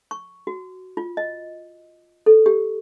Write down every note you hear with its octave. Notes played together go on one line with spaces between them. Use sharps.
C#6
F#4
F4
D#5
A4
G4